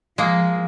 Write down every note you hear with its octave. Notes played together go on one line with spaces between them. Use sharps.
F3 G#3 A#3